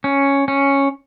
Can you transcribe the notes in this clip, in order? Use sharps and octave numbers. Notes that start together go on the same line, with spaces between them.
C#4
C#4